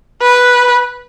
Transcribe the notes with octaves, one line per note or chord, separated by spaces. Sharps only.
B4